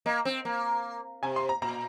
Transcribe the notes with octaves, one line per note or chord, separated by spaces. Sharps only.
A#3 D#5
C4
A#3
C3 G#5
C6
A#5
A#2 A#5